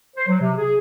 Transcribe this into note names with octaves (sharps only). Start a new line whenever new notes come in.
C5
F#3
C3
G#4